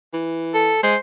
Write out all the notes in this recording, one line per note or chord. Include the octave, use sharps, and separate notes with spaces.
E3
A4
G#3 C5